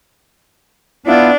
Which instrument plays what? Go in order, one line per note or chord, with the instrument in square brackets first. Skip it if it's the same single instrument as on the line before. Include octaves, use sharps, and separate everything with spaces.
[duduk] B3 [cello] D4 [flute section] E4 F4